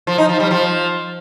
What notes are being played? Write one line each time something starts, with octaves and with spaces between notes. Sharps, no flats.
F3
D#4
F3
G3
F3